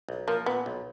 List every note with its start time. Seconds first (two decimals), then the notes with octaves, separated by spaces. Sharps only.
0.09 B1
0.28 F3 A#3
0.46 A#2 B3
0.66 B1